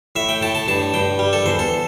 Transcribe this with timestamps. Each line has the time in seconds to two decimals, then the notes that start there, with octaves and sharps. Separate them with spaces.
0.16 A2 E5
0.29 G5
0.42 A2 A5
0.55 A5
0.68 G2 A5
0.94 G2 G5
1.19 G3
1.33 A4
1.46 E2 C5
1.59 A4